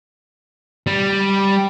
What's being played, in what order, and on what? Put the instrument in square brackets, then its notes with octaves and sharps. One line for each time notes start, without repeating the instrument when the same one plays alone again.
[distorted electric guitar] G3